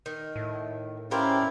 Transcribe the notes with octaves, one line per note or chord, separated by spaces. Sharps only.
D#3
A2
C#4 E4 G4 A#4 C5 D5 F5